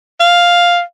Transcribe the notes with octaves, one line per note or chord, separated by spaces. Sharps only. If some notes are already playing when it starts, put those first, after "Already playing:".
F5